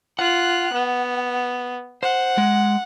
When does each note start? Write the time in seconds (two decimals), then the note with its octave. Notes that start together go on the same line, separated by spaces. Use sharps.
0.19 F4 F#5 F#6
0.73 B3
2.03 C5 F#5
2.38 G#3